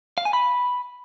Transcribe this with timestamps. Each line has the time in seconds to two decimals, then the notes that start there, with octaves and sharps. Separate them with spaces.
0.18 F5
0.25 G#5
0.33 B5